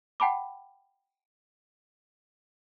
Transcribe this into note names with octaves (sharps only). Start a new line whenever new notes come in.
F#5 G5 A5 B5 D6